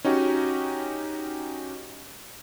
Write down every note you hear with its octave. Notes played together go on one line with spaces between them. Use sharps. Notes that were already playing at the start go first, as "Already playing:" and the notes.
C#4 D#4 F#4 G4